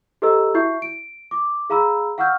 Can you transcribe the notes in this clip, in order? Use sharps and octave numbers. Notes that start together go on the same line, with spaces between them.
G4 A4 C5 D#5 A#5 E6
E4 F#4 E5 C#6 G6 C7
D7
D6
G#4 F5 A#5 B5 E6
F5 F#5 C#6 E6 F6 G6